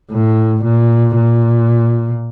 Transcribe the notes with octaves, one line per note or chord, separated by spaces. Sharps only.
A2
A#2
A#2